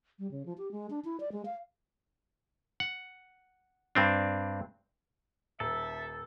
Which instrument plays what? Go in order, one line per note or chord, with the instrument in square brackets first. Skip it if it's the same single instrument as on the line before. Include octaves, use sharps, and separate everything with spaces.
[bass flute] G3
C#3
F3
G4
G#3
D4
E4
D5
G#3
F5
[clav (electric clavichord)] F#5
G2 C4 D4
[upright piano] D#1 [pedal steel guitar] A4 [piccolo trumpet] E5